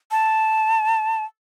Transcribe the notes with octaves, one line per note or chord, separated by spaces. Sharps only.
A5